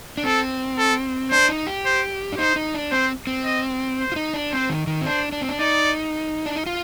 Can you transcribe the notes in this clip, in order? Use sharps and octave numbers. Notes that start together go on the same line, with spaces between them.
D4
C4 A4
A4
D4 C5
D#4
G4
C5
D4
D#4 C5
D#4
D4
C4 C5
C4
D#5
C5
F4
D#4
D4
C4 C5
D#3
D#3
C4
D4 C5
D4
C4
D4
D#4 D5
D4
D#4
F4